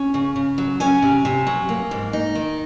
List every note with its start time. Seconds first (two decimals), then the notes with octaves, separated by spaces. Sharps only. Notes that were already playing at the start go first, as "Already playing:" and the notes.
Already playing: C#4
0.14 C#3
0.36 C#3
0.58 F#3
0.80 C#4 G#5
1.02 C3
1.25 C3
1.47 F#3
1.69 A#3
1.91 G#2
2.13 D#4
2.35 D#3